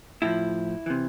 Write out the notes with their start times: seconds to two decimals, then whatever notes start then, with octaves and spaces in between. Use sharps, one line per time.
0.22 A2 F3 E4
0.86 C3 E3